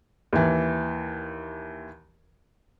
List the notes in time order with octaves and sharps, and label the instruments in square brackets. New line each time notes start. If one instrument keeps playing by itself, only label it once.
[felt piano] D#2 E3